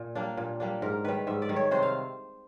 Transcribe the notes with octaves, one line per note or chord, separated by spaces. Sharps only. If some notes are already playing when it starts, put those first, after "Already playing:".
Already playing: A#2
G3 A#3 D4
A#2
G3 A#3 D4
G#2 A#4
D#3 G3 B4
G#2 E5
D5
D#3 G3
C#5
C3 C5
F5